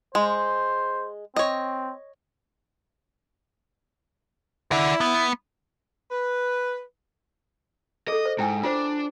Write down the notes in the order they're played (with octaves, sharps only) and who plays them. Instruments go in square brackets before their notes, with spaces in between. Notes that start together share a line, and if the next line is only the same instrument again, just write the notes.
[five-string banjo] G#3 [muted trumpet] C5
[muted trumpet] C4 [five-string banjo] C#5 D#5
[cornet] E4 [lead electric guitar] D5 F#5
[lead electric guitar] B3
[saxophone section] B4
[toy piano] G#4 A4 [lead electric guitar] D#5
[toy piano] C5
[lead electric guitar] G#2 [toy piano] E4 G5 G#5
[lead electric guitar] D4 [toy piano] F4 C5